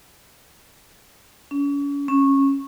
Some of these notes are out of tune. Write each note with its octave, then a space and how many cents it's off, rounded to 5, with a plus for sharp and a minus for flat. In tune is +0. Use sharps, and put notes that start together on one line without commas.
C#4 +40
C#4 -15